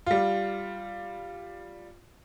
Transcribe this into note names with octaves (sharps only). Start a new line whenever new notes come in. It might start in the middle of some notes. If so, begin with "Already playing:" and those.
G3 F4